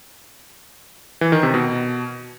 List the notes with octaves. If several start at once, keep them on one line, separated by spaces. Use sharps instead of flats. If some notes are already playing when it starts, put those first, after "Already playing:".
E3
D#3
C3
B2